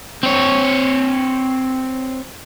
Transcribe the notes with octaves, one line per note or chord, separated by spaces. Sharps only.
C4 C#5